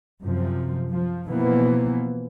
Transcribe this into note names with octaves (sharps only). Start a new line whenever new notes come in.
F#2 C3 F3
F3
B2 E3 F3 A#3 B3